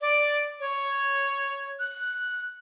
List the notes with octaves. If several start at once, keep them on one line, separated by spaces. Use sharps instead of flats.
D5
C#5
F#6